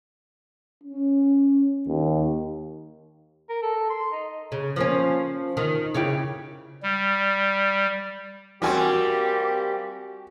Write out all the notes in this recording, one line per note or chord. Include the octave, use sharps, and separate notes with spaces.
C#4
D#2
A#4
A4
C6
D#4
C#3
F3 A#3 C#4
D#3
C#3 E4 G4
G3
G3 A#3 C4 F#4 G4 G#5